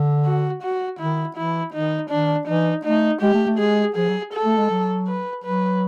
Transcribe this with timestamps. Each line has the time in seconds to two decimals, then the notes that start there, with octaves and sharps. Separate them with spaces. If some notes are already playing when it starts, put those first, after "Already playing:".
Already playing: D3
0.25 F#4
0.63 F#4
0.99 D#3 E4
1.37 E3 E4
1.74 D#3 D#4
2.10 D#3 D4
2.47 E3 D#4
2.85 A3 D#4
3.22 G#3 G4
3.34 A3
3.46 A3
3.58 G#3 G#4
3.96 F3 G#4
4.08 F#3
4.34 A4
4.45 A3
4.57 G#3
4.70 F#3
5.08 B4
5.44 F#3 B4